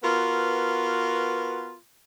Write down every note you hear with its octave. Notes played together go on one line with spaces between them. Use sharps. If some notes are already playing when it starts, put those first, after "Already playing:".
B3 F4 F#4 A#4 B4